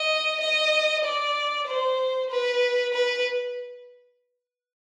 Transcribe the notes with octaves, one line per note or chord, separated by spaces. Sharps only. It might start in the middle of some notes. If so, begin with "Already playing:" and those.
Already playing: D#5
D#5
D5
C5
B4
B4